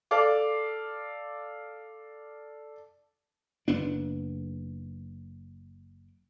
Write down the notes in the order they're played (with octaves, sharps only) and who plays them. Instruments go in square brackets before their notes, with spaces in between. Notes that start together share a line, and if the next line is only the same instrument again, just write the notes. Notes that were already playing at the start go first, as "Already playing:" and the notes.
[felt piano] A4 D5 F5 D6
[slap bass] F#1 B3 D4